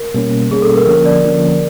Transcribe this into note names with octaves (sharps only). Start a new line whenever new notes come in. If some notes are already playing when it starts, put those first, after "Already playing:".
Already playing: A#4
B2 G3 A#3 C#4
B2 G3 A#3 C#4 G#4
A4
A#4
D3 F3 A#3 C#4 A#4
D5
D3 F3 A#3 C#4